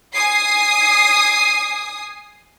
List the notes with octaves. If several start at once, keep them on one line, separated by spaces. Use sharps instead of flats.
G#5 D#6 C7